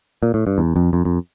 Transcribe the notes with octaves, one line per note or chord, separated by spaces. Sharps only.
A#2
A2
G2
E2
F2
F2
F2